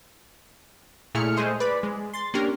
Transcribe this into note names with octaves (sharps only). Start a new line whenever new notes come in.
A#2 A3 E4 G#4 F6 C#7
G#3 A3 G#4 C5 D#5
B4 D5 B5
G#3
C6 A6
A#3 C#4 D4 G4 A#4